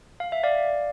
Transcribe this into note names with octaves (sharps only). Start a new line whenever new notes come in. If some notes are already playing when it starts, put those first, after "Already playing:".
F5
E5
D5 F5